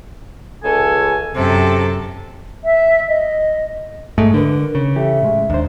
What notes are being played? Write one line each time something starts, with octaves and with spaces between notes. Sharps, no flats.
C#2 A4 G#5
F#2 C3 A4
E5
D#5
G#2 A3
D3 D4 A#4 B4
C#3
E3 G4 A4 E5
A2 G#3
D#2 D4 C5